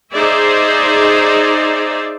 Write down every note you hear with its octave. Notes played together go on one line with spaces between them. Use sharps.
D#4 G#4 C5 D5 E5